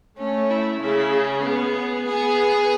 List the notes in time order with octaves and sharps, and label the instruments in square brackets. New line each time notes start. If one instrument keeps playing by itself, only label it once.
[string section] A3 [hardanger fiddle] C#4
[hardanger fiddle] E4
[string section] C#3 [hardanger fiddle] E4
[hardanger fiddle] G#4
[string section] B3
[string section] B3 [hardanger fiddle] G#4